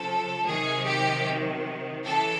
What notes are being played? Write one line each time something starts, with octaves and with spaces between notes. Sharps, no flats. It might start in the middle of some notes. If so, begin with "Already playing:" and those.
Already playing: C#3 F3 A4
C3 D#3 F#3 G#4
G4
C#3 E3 A4